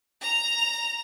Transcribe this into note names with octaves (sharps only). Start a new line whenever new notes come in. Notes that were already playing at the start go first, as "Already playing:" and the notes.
A#5 F7